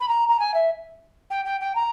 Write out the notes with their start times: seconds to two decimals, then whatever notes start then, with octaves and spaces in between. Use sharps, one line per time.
0.01 B5
0.08 A#5
0.29 A#5
0.40 G#5
0.54 E5
1.31 G5
1.45 G5
1.61 G5
1.76 A#5